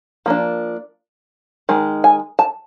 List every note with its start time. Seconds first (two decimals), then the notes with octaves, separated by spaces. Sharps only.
0.26 F3 A#3 D4
1.69 D#3 G#3
2.04 G#5
2.39 A5